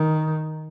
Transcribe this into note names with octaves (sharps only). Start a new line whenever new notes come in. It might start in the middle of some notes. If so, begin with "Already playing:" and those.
Already playing: D#3